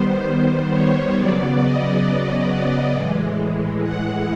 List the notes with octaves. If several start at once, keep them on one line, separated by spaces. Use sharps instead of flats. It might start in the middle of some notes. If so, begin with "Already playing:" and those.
Already playing: D#3 G3 B3 C5
C5
C#5
C#3 F#3 B3 D5
D#5
A2 E3 G#3
F#5